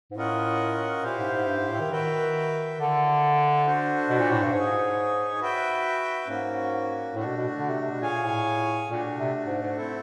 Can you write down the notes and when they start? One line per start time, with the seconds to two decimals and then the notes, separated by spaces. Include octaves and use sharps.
0.11 G#2
0.16 A2 C#4 F4 A#4 D#5 F#5
1.03 A#2 E4 G4 C5 F5
1.19 G#2
1.33 G#2
1.47 G2
1.58 G#2
1.69 A2
1.80 D#3
1.91 D#3 F#4 B4 E5 G5
2.79 D3 E4 A4 D5
3.66 D4 F#4 A4 C5
4.09 B2
4.20 A#2
4.31 A2
4.42 G2
4.52 G#2 D#4 G#4 C#5
5.41 F#4 B4 E5 G5
6.27 G#2 A#3 C#4 F#4
7.14 A2 A3 D4 F#4
7.25 B2
7.37 B2
7.58 D3
7.70 C3
7.81 C3
7.91 B2
8.01 A#2 G#4 C#5 F5 G#5
8.24 A2
8.89 A#2 A3 D4 F#4
9.19 C3
9.47 G#2
9.61 G#2
9.76 A3 C4 E4 A4